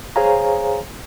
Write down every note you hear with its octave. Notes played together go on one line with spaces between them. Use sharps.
G#4 C5 C#5 F5 G#5 A#5